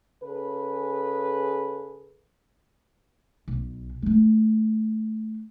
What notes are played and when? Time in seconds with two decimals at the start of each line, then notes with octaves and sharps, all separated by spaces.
0.24 C#3 G#4 A4 B4
3.48 B1
4.02 A3 D4